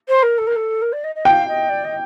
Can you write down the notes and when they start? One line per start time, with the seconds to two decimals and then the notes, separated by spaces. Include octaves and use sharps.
0.09 C5
0.23 A#4
0.38 A4
0.47 A#4
0.56 A4
0.82 A#4
0.93 D5
1.04 D#5
1.15 D#5
1.25 F5 G5
1.48 D#5
1.69 D5
1.85 D#5